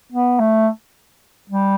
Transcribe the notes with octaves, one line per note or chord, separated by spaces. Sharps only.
B3
A3
G3